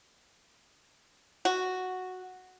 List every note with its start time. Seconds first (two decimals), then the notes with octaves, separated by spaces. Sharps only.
1.45 F#4